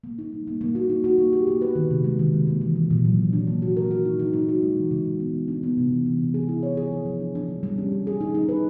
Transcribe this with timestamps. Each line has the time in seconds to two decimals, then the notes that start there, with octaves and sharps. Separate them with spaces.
0.04 A#3
0.19 D#4
0.32 G3
0.47 A#3
0.61 A#3
0.75 F#4
0.90 D#4
1.04 F#4
1.18 A#3
1.33 G4
1.47 A#3
1.62 B4
1.75 D#3
1.91 C3
2.04 G#3
2.19 D#3
2.33 C#3
2.47 A#3
2.61 E3
2.76 E3
2.91 A#2
3.05 F#3
3.18 A#2
3.33 D4
3.47 A#3
3.62 F#4
3.77 A#4
3.91 F#4
4.05 D#4
4.19 D#4
4.33 D#4
4.49 F#4
4.63 G#3
4.77 E3
4.91 C#3
5.05 G#3
5.20 B3
5.33 E3
5.48 D4
5.63 B3
5.77 C3
5.92 E3
6.06 E3
6.20 C3
6.34 G#4
6.49 E4
6.63 C#5
6.77 G#4
6.92 F3
7.05 F3
7.20 D4
7.35 D4
7.49 G3
7.63 G3
7.78 C#4
7.92 G3
8.07 G#4
8.21 D#4
8.35 D#4
8.49 B4